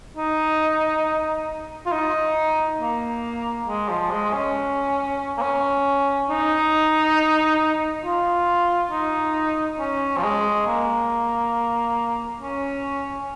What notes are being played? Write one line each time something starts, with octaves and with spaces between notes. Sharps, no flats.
D#4
F4
D#4
A#3
G#3
F3
G#3
C#4
A#3
C#4
D#4
F4
D#4
C#4
F3
G#3
A#3
C#4